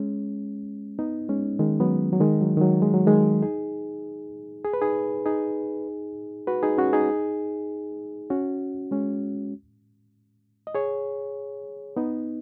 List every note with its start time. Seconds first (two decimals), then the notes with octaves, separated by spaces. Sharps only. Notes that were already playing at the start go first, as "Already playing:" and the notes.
Already playing: G#3 C#4
0.99 B3 D#4
1.29 G#3 C#4
1.59 D#3 G#3
1.80 F#3 B3
2.12 F#3
2.20 D#3 G#3
2.41 F#3
2.57 D#3
2.61 F#3
2.82 G#3
2.94 F#3
3.07 D#3 G#3
3.42 D#4 G#4
4.65 G#4
4.73 B4
4.82 D#4 G#4
5.26 D#4 G#4
6.47 F#4 B4
6.63 D#4 G#4
6.78 C#4 F#4
6.93 D#4 G#4
8.30 C#4 F#4
8.91 G#3 C#4
10.67 D#5
10.75 G#4 C#5
11.96 B3 D#4